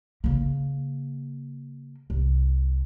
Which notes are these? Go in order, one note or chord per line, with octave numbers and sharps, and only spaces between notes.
C#3 A#3
C2